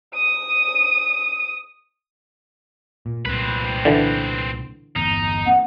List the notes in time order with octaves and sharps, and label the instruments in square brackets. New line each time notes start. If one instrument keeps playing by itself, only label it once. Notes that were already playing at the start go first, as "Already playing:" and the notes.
[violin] D#6 D#7
[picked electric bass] A#2
[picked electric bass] C2 A#2 [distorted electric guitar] C4 B4
[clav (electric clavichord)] D3 E3
[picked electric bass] G1 E2 [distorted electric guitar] D#4
[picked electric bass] A#3 C4 [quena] F#5